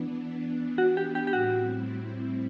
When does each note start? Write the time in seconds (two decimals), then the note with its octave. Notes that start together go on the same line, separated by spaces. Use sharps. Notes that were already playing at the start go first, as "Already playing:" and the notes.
Already playing: E3 B3 D4
0.78 F#4
0.97 G4
1.15 G4
1.27 G4
1.33 A2 G3 C4 E4 F#4